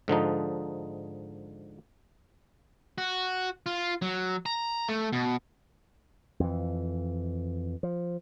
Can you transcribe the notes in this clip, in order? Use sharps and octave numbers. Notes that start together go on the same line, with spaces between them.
G#2 D3 F3 D#4
F#4
F4
F#3
A#5
A3
B2
F2 E3
F3